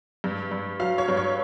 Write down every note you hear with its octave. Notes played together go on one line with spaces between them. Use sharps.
G2
G2
F#3 F5
C#5
G2
C#5